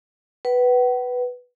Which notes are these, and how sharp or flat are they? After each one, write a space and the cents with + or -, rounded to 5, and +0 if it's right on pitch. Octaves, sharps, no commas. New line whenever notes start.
B4 +0 F#5 +40